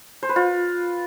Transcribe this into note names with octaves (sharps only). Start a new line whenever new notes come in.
C5
B4
F4